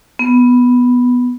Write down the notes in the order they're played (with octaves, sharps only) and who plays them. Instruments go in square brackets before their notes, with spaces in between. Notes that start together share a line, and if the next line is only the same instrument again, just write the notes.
[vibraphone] B3